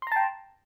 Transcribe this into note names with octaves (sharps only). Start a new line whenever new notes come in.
G5 A5 A#5 C6